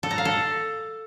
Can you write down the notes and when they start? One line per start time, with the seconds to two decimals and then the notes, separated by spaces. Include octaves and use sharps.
0.03 A4
0.11 A#5
0.18 F5
0.25 A4